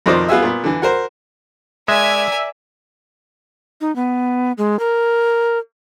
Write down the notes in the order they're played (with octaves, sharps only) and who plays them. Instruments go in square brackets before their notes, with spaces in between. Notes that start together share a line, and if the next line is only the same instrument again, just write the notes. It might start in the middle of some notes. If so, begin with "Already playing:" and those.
[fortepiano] F2 B2 D#3 F3 C5 D5
B3 F4 F#4 G#4 E5
A#2 B3
D3 E3
F#4 A#4 C5
[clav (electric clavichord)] G#3 [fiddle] A#4 G#5 [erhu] D5 [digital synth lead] E5
[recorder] D#4
B3
G#3
A#4